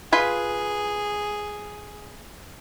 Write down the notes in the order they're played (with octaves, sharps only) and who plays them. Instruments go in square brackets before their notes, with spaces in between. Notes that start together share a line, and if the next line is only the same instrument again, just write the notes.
[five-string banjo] F4 B4 G#5 [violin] G#4